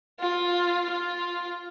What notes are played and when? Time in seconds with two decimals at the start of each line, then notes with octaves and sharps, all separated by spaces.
0.19 F4
0.89 F4